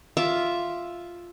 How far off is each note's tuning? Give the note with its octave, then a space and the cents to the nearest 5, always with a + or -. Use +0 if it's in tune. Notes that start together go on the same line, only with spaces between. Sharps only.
F4 +0 E5 +0 D6 -10